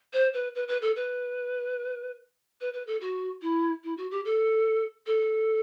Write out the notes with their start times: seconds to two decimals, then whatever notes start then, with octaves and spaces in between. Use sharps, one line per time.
0.13 C5
0.34 B4
0.55 B4
0.68 B4
0.82 A4
0.96 B4
2.61 B4
2.74 B4
2.87 A4
3.01 F#4
3.42 E4
3.84 E4
3.97 F#4
4.11 G4
4.25 A4
5.07 A4